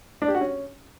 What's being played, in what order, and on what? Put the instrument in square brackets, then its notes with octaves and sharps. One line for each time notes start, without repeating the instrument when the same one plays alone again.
[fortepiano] D4
G4
F#4
C#4